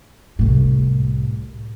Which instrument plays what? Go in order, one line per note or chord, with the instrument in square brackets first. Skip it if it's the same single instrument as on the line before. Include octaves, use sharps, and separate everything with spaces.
[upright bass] C2 A2